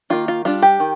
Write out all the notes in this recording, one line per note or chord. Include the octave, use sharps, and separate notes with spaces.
D#3 A#3 D#4 F4
F4
G3 D4 F4
G4
D#3